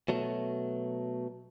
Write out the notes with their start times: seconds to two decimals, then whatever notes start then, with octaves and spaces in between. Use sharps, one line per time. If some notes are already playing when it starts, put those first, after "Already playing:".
0.08 B2 F#3 A3